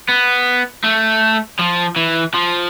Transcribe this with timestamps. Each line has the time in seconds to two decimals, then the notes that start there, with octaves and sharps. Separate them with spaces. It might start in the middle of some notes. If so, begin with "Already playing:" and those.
0.09 B3
0.84 A3
1.59 F3
1.96 E3
2.34 F3